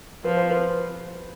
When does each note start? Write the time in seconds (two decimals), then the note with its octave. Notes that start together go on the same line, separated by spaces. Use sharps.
0.24 F3 B4
0.37 C5
0.50 B4